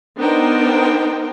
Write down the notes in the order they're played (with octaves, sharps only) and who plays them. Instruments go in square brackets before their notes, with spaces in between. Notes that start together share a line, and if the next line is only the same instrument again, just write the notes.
[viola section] B3 D4 D#4 A#4 C5 G5